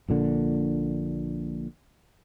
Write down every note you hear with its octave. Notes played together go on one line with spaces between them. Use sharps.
A#1 A#2 D3